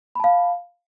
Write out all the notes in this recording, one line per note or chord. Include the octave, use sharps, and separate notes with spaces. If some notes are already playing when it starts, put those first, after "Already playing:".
F5 A5 B5